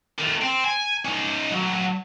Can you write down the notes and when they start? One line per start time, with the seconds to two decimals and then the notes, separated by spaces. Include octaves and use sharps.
0.18 D#3 A3
0.41 C4
0.64 G#5
1.05 C#4 D#4
1.50 F#3 A3